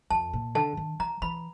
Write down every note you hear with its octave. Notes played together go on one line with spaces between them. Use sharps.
F2 A5
A#2
D3 A5
D#3
E3 A#5
E3 B5